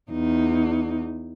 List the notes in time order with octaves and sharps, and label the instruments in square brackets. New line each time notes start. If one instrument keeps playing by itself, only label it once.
[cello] E2 D#4